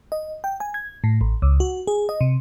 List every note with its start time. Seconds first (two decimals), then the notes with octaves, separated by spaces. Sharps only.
0.12 D#5
0.44 G5
0.60 G#5
0.74 G#6
1.04 A2
1.21 A1
1.42 C#2
1.60 F#4
1.87 G#4
2.09 D#5
2.21 C3